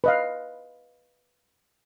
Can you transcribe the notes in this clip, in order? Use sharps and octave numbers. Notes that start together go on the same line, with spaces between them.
B4 D#5 F5